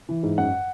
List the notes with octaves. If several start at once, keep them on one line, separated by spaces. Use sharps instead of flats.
E3
G#2
F#2 F#5